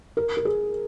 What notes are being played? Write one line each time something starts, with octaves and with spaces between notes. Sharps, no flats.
A#4
A#4
G#4